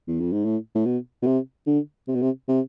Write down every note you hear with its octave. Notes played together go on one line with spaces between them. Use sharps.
E2
F2
G#2
A2
A2
B2
B2
C3
D3
C3
B2
C3
C3